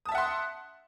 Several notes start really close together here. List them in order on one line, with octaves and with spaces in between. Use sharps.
D#6 A5 E5 F#5 C6